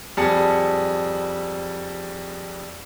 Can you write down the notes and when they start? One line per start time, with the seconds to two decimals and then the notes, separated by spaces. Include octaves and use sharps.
0.17 F2 G3 G#4 A5 C#7